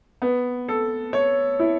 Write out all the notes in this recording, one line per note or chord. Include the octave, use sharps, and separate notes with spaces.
B3
A4
C#5
E4